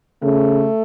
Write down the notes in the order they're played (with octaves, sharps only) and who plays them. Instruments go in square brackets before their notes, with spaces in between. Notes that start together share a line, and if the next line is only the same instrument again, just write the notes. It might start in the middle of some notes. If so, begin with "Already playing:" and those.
[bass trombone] C#3 [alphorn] A3